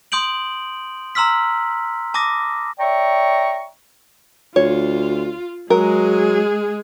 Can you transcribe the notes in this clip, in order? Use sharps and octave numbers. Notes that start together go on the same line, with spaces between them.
C6 D#6 G6 D7 F#7
A#5 C6 E6 F6 B6
A5 D6 D#6 A#6
C#5 D5 E5 G5 A#5 C#6
D2 F4 C#5
F#3 G#3 G#4 A#4